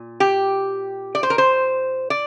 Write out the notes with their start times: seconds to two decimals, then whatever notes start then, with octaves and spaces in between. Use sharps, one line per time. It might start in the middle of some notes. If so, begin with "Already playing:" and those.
Already playing: A#2
0.20 G4
1.15 D5
1.23 C5
1.30 A#4
1.38 C5
2.10 D5